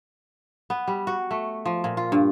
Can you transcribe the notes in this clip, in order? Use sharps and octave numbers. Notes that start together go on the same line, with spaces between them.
B3
G3
F#4
A3
F3
A#2
F4
G2